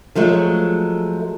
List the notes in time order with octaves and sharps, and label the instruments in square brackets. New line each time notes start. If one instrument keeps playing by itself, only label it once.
[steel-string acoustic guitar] F3 F#3 G#3 A3